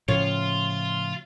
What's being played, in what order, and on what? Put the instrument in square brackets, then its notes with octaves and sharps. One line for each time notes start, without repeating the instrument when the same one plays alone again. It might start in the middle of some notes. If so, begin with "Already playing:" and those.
[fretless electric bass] A2 C#3 F3 [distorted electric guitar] F4 [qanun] C#5